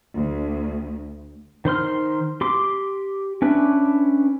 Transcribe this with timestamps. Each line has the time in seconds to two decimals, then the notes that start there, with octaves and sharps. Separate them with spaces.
0.14 D2
1.65 D#3 C5 C6 F6
2.41 G4 C6 D6
3.42 C#4 D4 B4 E5